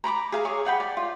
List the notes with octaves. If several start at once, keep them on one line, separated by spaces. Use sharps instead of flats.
A#5 B5 C#6 D6
G#4 F5 A#5
G#4 C#5 C#6 D6
G#4 F#5 G5 B5
D5
F4